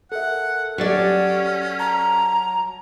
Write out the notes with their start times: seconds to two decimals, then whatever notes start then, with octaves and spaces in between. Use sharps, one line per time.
0.12 A4 A#4 E5 F#5
0.78 F#3 C#4 G4 A4 D5 A6 C#7
1.79 A5 A#5